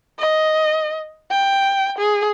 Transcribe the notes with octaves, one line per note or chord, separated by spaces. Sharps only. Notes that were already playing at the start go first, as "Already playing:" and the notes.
D#5
G5
G#4